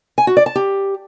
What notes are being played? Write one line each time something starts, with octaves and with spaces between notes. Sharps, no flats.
G#5
F#4
D5
A5
G4